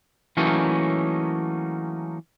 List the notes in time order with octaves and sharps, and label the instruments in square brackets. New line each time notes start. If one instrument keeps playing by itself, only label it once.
[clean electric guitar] E3 F#3 A3 A#3 C#4 D#4